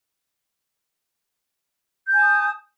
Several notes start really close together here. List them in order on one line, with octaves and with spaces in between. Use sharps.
G6 G#5 A5 D#6